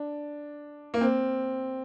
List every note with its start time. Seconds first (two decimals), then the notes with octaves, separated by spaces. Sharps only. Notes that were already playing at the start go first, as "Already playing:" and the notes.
Already playing: D4
0.94 A#3
1.01 C4